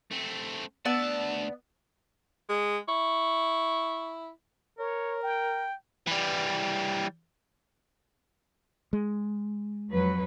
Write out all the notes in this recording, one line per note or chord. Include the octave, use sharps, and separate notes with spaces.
A3 C4
D2 B3 D5 A5 E6
G#3
E4 C#6
A#4 C#5
G5
E3 G3
G#3
F2 F#3 B4